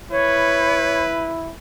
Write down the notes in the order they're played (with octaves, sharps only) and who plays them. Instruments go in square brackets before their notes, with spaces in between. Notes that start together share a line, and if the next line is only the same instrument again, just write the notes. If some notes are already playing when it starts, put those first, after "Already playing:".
[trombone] E4 [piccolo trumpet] B4 [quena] C#5